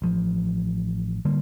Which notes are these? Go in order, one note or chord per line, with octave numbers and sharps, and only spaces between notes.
A1 F3
D3 G3 A#3